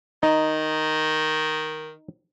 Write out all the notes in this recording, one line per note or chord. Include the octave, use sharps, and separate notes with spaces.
D#3 D#4